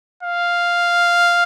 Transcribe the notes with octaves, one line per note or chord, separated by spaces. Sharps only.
F5